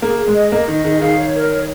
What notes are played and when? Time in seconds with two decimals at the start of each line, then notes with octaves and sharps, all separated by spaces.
0.02 A#3 G#4
0.19 G#4
0.28 G#3
0.35 D#5
0.52 A#3 D#5
0.68 D#3 D#5
0.84 D#3 G#4
1.01 D#3 F5
1.17 C#5
1.35 A#4
1.51 C#5